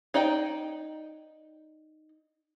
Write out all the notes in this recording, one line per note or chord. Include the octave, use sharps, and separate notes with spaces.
D#4 D5 D#5 G5